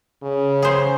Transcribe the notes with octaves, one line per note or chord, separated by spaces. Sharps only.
C#3
G#4 C5